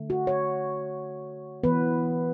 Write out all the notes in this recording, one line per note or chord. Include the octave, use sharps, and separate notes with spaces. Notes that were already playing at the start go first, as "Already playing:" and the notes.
Already playing: D3 A3
F#4
C#5
E3 B3 B4